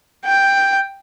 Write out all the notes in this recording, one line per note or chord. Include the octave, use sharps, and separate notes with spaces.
G5